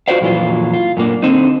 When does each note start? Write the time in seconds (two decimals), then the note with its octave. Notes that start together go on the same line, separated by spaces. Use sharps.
0.08 F4 F#4 A#4 C5 D5 F5
0.21 F2 A#2 E3 F#3 F4
0.73 F4
0.97 F#2 A#2 A#3 D4
1.23 D3 C4 D#4